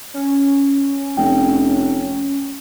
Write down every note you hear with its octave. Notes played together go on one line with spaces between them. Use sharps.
C#4
F1 G5